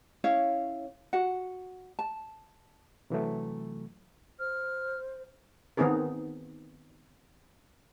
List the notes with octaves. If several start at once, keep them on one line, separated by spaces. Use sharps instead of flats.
C#4 E4 C#5 F5
F#4 F#5
A5
C3 E3 F#3 A3
C5 F6
D#3 B3 C4 D#4 G#4 A#4